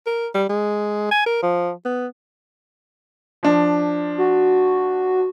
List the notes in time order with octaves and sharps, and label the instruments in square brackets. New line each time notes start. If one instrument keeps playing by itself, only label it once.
[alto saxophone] A#4
G3
G#3
G#5
A#4
F3
B3
[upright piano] F3 D4
[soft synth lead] F#4